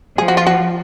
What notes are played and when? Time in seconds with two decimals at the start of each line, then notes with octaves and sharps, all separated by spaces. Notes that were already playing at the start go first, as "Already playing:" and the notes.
0.18 F3 G#4
0.28 F#4
0.37 F4
0.46 F#4